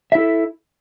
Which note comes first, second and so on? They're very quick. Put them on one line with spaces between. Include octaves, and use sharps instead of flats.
E5 E4 A4